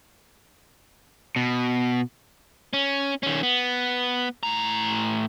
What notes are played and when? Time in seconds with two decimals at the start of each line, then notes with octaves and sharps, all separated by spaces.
1.36 B2
2.73 C#4
3.23 D#3 C#4
3.43 B3
4.43 A2 A#5